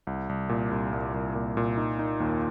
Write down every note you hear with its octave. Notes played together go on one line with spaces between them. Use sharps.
C2
C2
A#2
C2
C2
C2
A#2
A#2
D#4
D#4
D#2